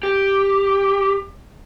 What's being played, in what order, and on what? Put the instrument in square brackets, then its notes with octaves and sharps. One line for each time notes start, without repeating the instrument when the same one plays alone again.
[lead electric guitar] G4